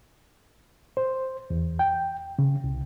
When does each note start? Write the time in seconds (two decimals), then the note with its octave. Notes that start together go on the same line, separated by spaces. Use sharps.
0.97 C5
1.50 E2
1.79 G5
2.39 C#3
2.64 C2